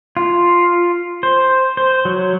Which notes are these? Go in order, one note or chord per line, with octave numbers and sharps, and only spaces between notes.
F4
C5
C5
F#3